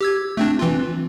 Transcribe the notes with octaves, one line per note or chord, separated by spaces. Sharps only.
G4 E6 G#6
A3 C4 D4
E3 C4 F4